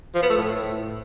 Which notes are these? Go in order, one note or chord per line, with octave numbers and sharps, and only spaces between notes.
F3
B3
A3
A2